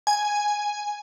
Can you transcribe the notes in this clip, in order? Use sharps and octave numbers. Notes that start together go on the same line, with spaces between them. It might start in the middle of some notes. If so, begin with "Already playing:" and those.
G#5